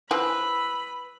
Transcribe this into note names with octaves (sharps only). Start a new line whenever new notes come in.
E3 F3 B4 B5 E6 F#6